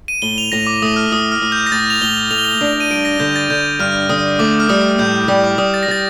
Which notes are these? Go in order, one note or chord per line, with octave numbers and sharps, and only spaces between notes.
D#7
A2 G7
F7
A2 A#6
D6
A3 D#6
F6
A2 D#6
F6
A2
G6
A#6
A2 A6
F7
A2 G7
A3 F7
G7
F7
D4
D#7
G2 D7
A#6
D3 G6
A6
D3 G6
G2 F6
D3 D#6
A3 D6
F6
G3 D#6
A2 G6
G3 D#6
D6
G3 D#6
A6
A#6
G3 A6